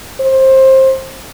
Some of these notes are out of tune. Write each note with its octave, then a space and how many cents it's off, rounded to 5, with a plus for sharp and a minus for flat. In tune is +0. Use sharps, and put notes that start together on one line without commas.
C5 +20